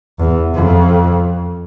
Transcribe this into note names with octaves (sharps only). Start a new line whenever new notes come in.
E2
F2